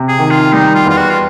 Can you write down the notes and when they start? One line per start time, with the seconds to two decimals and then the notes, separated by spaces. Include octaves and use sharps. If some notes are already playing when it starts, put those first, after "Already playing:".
Already playing: C3
0.08 G#4
0.19 D#3
0.31 F4
0.53 G3 D#4
0.75 F4
0.86 E2 F4
0.97 F#4
1.10 F4